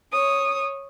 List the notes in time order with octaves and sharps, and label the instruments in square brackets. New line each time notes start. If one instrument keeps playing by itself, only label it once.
[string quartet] C#5 D#6